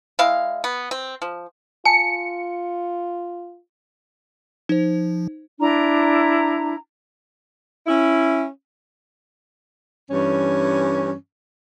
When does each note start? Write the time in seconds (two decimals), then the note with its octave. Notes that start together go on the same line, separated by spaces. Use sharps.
0.19 G#3 E4 F5
0.64 B3
0.91 C4
1.22 F3
1.85 F4 G#5 A5 C#7
4.69 F3 D#4 C5
5.58 D4 E4 A#5
7.87 C#4 E4
10.09 G2 E3 C#4